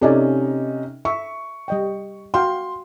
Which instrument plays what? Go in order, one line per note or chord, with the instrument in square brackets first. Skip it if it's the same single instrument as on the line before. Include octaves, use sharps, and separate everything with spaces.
[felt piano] C3 C#4 D#4 [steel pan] A4 D5 G#5
[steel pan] E5 [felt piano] C#6
[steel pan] G3 D#5 G5
[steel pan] F#4 F5 G5 [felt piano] C6